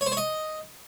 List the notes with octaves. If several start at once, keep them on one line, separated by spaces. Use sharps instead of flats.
C#5
C5
C#5
D#5